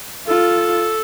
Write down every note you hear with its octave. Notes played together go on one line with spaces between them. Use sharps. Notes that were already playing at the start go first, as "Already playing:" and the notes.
F4 A4